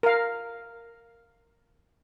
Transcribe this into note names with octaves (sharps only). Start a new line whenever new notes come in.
A#4 F5